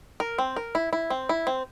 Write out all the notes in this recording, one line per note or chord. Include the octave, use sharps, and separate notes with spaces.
A#4
C4
A#4
E4
E4
C4
E4
C4